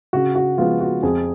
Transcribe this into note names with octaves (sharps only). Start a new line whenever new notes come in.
C#3 F#4
F#4
F3 G#3 B3 F4
F#4
F2 G#4